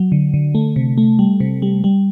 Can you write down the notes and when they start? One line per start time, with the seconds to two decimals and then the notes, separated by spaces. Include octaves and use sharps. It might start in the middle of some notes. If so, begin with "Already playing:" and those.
Already playing: F#3
0.12 D3
0.34 D3
0.55 A3
0.76 C3
0.98 A3
1.19 G3
1.40 C3
1.62 G3
1.84 G3